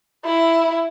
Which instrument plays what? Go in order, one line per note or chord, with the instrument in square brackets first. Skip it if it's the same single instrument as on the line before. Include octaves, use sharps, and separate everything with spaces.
[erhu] E4